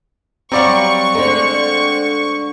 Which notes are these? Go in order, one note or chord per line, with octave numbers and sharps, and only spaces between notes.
F#3 G3 C4 D5 F5 A#5 B5 C#6
D3 G#3 A3 D4 C5